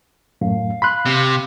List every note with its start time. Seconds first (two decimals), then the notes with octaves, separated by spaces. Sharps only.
0.41 F#2 A2 F5
0.82 B5 C6 F#6
1.05 C3